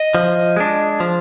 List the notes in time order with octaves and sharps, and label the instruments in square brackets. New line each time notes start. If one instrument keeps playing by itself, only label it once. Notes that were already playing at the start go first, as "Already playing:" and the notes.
Already playing: [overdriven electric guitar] D#5
[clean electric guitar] F3
G#3 D4
F3